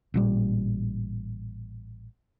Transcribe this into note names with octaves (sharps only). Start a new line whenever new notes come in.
A1 A#2 G3